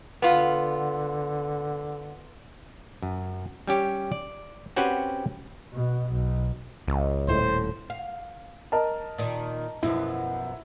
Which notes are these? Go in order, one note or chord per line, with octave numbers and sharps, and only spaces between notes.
D3 B3 F4
F#2
G3 C#4 G4 C#5
D5
C4 C#4 F#4 G4 B4 F#5
B2
B1
C#2
D#1 A2 C5
F5
A#4 D#5 A5
A#2 D#3
F#2 B2 F3 E4